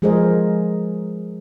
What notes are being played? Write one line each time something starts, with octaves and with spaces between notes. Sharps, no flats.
F3 G#3 G#4 A#4 C5 D#5